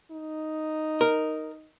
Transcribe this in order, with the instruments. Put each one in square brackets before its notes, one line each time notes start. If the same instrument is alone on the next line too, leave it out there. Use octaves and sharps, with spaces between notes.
[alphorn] D#4
[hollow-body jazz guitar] A#4